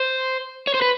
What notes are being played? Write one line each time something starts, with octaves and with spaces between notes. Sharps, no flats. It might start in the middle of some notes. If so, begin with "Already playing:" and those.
Already playing: C5
C#5
C5
B4